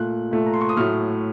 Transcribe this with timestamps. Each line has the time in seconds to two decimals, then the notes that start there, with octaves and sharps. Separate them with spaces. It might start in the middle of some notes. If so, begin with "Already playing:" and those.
Already playing: A#2 A3 F#6
0.31 A#2 A3
0.46 A#5
0.54 C6
0.61 C#6
0.69 D#6
0.77 A2 F#3 A3 F6